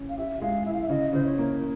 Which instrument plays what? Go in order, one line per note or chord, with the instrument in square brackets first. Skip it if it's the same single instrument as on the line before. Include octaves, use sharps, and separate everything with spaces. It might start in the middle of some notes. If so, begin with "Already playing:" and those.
Already playing: [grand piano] C#4
[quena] F5
[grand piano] G4 [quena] E5
[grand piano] G#3 [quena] F5
[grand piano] E4 [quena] E5
[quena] F5
E5
[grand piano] C#3 [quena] D#5
[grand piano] C#3 [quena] C5
[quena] C#5
[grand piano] A#3